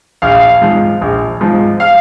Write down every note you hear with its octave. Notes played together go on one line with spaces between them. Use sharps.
A#1 F5
G#2 F3
A#1
G#2 F3
F5